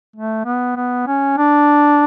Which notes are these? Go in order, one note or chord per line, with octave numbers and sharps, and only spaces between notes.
A3
B3
B3
C#4
D4